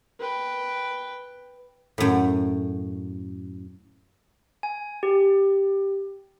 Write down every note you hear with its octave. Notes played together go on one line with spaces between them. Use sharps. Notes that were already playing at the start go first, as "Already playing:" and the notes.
B4 G5
F#2 A2
G#5
G4